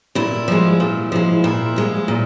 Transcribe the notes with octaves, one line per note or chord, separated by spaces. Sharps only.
A#2 E4
F3 G#3
A#2
F3 G#3
A#2 E4
F3 G#3
A#2